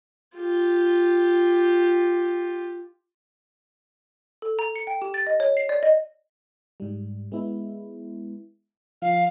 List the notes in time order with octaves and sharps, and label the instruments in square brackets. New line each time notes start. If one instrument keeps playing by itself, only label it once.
[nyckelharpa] F4 G4
[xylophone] A4
A#5
C#7
G5
G4
A6
D#5
C#5
C7
D5
D#5
[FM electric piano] G#2 G3
G#3 B3 E4
[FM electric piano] F3 [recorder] F5